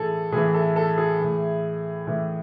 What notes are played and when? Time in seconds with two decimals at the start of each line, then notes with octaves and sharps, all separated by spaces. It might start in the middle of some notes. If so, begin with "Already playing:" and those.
Already playing: A2 E3 G#4 A4
0.32 A2 G#4
0.37 E3
0.54 A4
0.76 A4
0.98 G#4
1.20 A2 E3
2.07 A2 E3